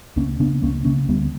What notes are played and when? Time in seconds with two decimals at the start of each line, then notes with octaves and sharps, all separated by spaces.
0.16 C#2 A#3 C#4
0.40 C#3 B3 D4
0.62 C#2 A#3 C#4
0.85 C#3 A#3 C#4
1.08 D2 G3 B3